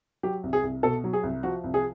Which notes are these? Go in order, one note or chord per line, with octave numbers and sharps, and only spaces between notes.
F#3 G4
C2
G#4
C2
B2 A4
F#3
G#4
C2
F3 F#4
C2
G#4